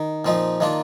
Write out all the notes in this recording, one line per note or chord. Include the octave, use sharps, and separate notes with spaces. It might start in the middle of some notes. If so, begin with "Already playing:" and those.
Already playing: D#3
A#2 F3 C4 D#4
D#3 A#3 D4 F4